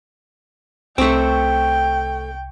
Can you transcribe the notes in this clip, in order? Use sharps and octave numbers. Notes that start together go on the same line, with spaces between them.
C2 A3 C4 G5 C#6